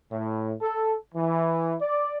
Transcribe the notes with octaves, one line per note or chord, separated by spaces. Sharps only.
A2
A4
E3
D5